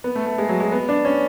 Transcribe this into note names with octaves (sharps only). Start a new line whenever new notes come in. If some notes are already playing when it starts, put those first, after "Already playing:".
B3
A3
A3
G#3
F#3
G#3
B3
D4
C#4